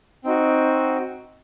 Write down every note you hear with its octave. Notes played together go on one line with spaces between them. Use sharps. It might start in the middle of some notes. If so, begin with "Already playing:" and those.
C4 D#4 F#4